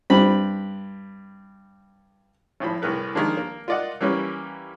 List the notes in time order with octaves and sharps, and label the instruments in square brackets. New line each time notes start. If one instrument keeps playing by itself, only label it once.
[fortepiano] G2 C4 B5
G#1 A2 F3 B5
C2 A2 G#4 A#4 B4
D#3 F3 G#3 A#3 D4
A#3
F4 A#4 D5 D#5 F#5
E3 G3 A#3 C#4 B4